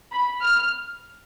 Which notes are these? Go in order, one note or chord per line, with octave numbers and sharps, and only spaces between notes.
B5
F6